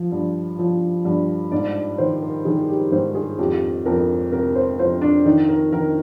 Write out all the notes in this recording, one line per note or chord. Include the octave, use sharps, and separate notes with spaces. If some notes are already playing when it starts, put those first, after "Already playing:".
Already playing: F3
G2
F3
G2
G#2 D5
D#3 C5
A#4
D#3 G#4
G4
G#2 C5
G#4
F2 G4
F2 A#4
C3 A#4
C5
F2 C5
D4
D#3 D#4
A#4
D#3 A#4